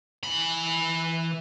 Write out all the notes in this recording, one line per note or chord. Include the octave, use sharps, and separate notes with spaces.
E3 B5